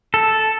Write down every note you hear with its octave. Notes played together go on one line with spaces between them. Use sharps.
A4